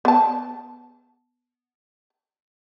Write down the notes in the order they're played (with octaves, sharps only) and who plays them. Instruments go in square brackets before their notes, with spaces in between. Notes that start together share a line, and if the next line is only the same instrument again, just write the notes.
[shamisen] B3 A5